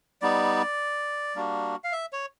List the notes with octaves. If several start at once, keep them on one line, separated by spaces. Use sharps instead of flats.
G3 B3 D#4 D5
G3 A#3 D4 F#4
F5
E5
C#5